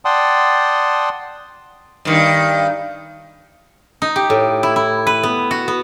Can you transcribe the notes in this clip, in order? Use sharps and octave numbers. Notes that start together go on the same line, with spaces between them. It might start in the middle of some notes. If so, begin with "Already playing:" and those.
D5 F#5 G5 A5 C6 D#6
G2 D#3
D#4
G4
A2
E4
E4
B4
B3
F#4
B3